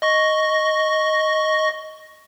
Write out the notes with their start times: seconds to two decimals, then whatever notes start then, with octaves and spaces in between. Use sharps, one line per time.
0.02 D#5 C#6 A#6